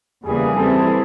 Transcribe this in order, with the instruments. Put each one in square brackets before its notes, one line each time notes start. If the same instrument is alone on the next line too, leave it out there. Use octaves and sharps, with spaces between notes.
[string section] E2 C#3 E3 G3 A#3 [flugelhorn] G#4
[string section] E3 G3 C4 E4 G#4 [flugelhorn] A4